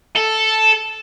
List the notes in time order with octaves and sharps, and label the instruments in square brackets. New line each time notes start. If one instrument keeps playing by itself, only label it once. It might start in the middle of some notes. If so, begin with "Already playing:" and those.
[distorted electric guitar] A4